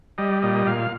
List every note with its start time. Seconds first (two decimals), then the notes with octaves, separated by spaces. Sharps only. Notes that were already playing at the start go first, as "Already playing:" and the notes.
0.18 G3 D#5
0.42 A#2 D#5
0.67 A#2 F5